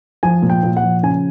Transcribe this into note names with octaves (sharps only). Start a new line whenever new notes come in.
F3 G#5
A#2
G5
A#2
F#5
F3
C#3 G#5